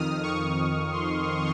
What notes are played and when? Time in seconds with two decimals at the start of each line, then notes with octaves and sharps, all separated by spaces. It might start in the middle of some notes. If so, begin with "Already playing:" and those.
Already playing: F2 D#3 D#6 F6
0.23 C#6
0.93 C6